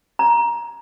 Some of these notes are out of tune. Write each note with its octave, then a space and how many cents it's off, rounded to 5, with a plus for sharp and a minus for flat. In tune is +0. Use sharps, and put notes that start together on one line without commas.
A#5 +15